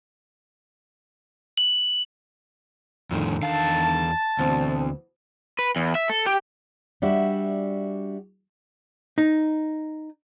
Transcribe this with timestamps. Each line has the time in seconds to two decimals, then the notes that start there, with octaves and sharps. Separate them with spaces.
1.57 F#7
3.11 F2 A2 D3 D#3
3.43 E2 F5 A5
4.39 D2 B2 E3 C4
5.59 B4
5.76 E2
5.95 E5
6.10 A4
6.26 G4
7.02 G3 D4 F#4 E5
9.18 D#4